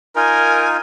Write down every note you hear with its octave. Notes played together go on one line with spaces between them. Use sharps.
D#4 F4 A#4 G#5